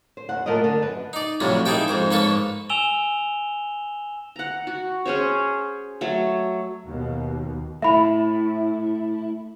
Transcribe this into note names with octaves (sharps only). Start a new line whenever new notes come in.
C5
D#2 F#5
A#2 A3 A#3 F4 A#4 D#5
D3
F#2 B4
D#4 D5
F2 A2 C3 F#3 G3
A#3 D#4 E4 G#4 A4 G5
F2 G#2 C5
G#2 A#3 A4 B4 C#5
G#5 E6 E7 F7 G7
F#5 A#5
F#4
C#4 G#4 C5 C#5
F#3 A3 C#5
D#2 B2
A3 E4 E5 B5